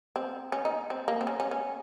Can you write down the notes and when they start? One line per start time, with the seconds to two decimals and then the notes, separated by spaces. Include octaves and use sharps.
0.16 C4
0.52 C#4
0.65 D#4
0.90 C4
1.08 A#3
1.21 C4
1.27 C#4
1.40 C#4
1.51 C#4